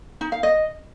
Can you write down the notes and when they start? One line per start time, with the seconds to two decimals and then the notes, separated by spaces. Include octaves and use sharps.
0.21 D#4
0.32 F5
0.43 D#5